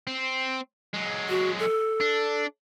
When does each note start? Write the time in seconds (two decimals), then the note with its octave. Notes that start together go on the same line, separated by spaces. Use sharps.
0.07 C4
0.94 F#3 G#3
1.29 F#4
1.59 A4
2.01 D4